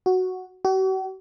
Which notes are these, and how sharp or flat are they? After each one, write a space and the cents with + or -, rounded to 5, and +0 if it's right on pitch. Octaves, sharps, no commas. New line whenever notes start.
F#4 +0
F#4 +45